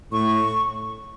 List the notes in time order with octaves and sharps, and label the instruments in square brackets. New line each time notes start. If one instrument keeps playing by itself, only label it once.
[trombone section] A2 [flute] C#6